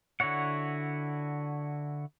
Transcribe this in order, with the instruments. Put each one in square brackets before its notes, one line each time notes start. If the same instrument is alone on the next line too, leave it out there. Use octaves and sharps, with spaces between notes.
[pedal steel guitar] D3 E4 F#4 C#5 F#5